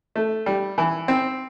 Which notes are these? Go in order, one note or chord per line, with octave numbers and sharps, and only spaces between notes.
A3
G3
E3
C4